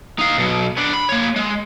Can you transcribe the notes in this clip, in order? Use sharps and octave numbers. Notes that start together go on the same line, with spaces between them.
D#4 F5
B2 F#3
B3 D4
B5
A#3 C#5
G#3